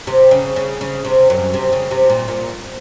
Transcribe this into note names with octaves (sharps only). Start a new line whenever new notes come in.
C3
C#3
C#3
C#3
C3
F#2
C3
C#3
C3
A#2
A#2